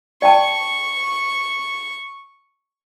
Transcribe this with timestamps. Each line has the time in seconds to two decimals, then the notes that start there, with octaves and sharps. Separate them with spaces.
0.22 D5 G5 A5 C#6